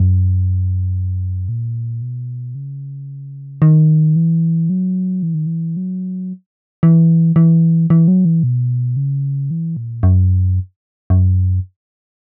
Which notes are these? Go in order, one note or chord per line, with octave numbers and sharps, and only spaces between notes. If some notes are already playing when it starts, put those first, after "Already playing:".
Already playing: F#2
A#2
B2
C#3
D#3
E3
F#3
E3
D#3
E3
F#3
E3
E3
E3
F#3
E3
B2
C#3
E3
A#2
F#2
F#2